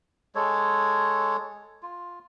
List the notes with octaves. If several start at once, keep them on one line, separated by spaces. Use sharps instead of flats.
G#3 A4 C#5
F4